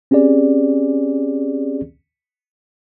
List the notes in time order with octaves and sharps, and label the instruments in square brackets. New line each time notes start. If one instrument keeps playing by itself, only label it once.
[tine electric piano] C4 C#4 G4 G#4 D5